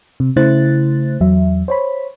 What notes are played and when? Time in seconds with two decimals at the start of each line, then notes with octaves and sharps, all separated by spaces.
0.20 C3
0.36 C#3 A3 E4 C5 F#6 A6
1.21 E2 F#3 E5
1.68 C5 C#5 B5